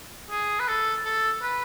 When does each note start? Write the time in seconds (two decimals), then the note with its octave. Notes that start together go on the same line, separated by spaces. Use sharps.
0.31 G#4
0.60 B4
0.68 A4
1.05 A4
1.42 B4